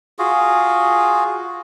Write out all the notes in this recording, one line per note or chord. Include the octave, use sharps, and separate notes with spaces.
F4 F#4 G#4